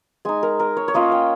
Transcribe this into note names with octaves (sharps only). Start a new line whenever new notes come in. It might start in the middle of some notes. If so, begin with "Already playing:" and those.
G#3 D#4 G#5
A#4
A#4
C#5
C#5
A#3 C#4 F4 D#5
G5